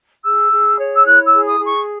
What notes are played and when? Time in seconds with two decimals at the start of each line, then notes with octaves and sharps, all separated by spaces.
0.24 G#4 E6
0.52 G#4
0.79 C#5
0.95 E6
1.06 E4 F#6
1.26 E6
1.33 G#4
1.47 D#6
1.59 G#4
1.66 C#6